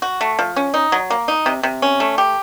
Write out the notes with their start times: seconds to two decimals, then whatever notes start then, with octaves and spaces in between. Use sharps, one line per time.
0.02 F#4
0.21 A3
0.39 F3
0.56 C#4
0.74 D#4
0.92 F#3
1.10 A#3
1.28 D#4
1.46 C3
1.63 C3
1.82 C#4
2.00 A3
2.18 G4